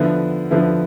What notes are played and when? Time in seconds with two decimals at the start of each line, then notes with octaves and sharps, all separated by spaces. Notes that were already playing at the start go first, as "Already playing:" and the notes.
Already playing: D3 F3 B3 E4
0.51 D3 F3 B3 E4